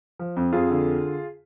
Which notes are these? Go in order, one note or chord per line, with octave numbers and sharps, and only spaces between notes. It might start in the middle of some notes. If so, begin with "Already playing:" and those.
F3
F2
F2 F4 G#4
D3